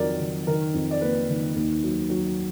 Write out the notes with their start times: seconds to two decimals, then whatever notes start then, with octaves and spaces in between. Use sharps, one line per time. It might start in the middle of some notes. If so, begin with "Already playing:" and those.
Already playing: F2 D#3 F#3 A#4 D5
0.20 D#3
0.47 D#3 A#4
0.74 F2
0.91 D5
1.01 A#3 B4
1.29 D#3
1.56 D#2
1.84 F#3
2.10 F#3